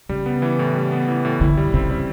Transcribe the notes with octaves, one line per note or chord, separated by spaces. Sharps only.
C#3 G3
B3
E3
A2
G3
B3
E3
A2
D3 E4
G3
C#3 C4
G3